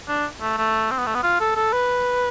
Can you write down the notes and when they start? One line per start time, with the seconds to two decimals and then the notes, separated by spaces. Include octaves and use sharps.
0.08 D4
0.41 A3
0.57 A3
0.91 C4
0.98 B3
1.06 A3
1.15 B3
1.23 F4
1.40 A4
1.55 A4
1.73 B4